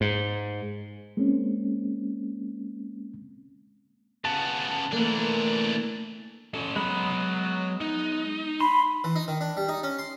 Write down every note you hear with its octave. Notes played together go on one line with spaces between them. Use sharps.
G#2
G#3 A#3 C4 C#4
C#3 B3 A5
E3 A3 A#3 D4
C#4 A4
F#3 G#3 B3 B5
D#4
B5 C6
E3
D#4
D#3
D4
G3
D#4
C#4
C6